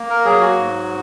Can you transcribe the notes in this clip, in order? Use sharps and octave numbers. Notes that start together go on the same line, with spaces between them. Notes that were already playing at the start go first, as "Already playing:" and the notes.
Already playing: A#3
A#4
F#3 G#4
F#4
G#2